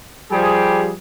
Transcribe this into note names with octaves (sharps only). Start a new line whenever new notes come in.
F3 G3 G#4